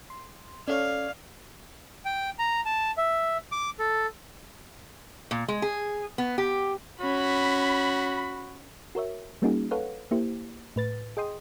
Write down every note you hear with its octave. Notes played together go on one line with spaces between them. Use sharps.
C6
C#4 A4 C#5 D5 F5
G5
A#5
A5
E5
D6
A4
A#2
G#3
G#4
B3
G4
C#4 F#4 B5
F#4 A#4 C#5 E5
G3 A#3 C#4 D#4 F#4 G#4
A4 B4 C#5 F5 F#5
A#3 E4 G4 C5
A2 B4 A6
G#4 D#5 G5 C6 D#6